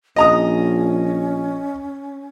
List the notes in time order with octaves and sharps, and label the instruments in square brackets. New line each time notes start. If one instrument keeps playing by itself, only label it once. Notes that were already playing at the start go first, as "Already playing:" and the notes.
[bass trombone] A#1 [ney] C#4 [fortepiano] D#5 A#5 D#6